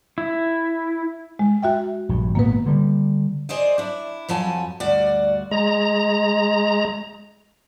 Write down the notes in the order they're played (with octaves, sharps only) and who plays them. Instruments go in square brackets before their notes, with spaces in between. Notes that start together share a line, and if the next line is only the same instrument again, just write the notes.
[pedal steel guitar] E4
[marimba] G#3
F#4 E5 G5
[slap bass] A#1 G2
[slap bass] G#1 A#2 B3 [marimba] A#3 B4
[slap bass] D3 G3
[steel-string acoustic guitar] G#4 C5 D5 D#5
D4 E4
F2 F3 F#3 G#5 A5
D2 G2 F#4 D5
[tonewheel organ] G#3 A#5